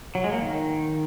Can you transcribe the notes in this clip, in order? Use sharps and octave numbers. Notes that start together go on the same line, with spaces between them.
F#3
G#3
A#3
D#3